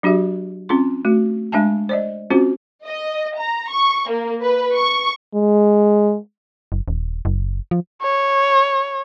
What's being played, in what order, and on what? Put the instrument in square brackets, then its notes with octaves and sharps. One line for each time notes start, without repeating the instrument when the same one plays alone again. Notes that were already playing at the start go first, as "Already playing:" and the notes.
[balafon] F#3 D4 F#4 G4 E5
C4 C#4 F4 C6
A3 F#4
G#3 D4 E5 G#5 A5
C5 D5 D#5
C4 C#4 F4 F#4 C5
[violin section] D#5
A#5
C#6
A#3
B4
C#6
[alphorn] G#3
[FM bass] F#1
D#1
F#1
F3
[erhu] C#5